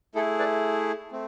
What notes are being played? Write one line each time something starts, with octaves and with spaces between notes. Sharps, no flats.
A3 E4 G#4 A4
B4 D5
A3 C4